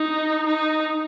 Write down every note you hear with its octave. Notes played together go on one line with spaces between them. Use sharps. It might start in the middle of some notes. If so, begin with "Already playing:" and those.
Already playing: D#4
D#4